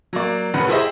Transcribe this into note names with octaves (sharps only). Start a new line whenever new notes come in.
F#3 A#3 D5
F1 D#3 C#4 B4 F#5
E4 G4 G#4 C5 D#5 E5